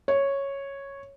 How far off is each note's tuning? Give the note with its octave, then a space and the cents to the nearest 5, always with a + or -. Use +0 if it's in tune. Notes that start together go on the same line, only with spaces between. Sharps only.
C#5 -5